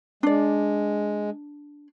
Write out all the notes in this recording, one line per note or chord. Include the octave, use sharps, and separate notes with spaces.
G#3 D4 D5